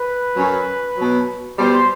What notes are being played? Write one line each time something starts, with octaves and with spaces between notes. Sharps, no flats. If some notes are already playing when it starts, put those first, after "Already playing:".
Already playing: B4
F#2 F#3
B2 F#3
B2 G3 C5